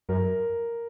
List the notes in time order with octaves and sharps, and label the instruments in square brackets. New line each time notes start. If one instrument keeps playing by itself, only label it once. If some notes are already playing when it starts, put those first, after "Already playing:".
[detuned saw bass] F#2 [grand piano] A#4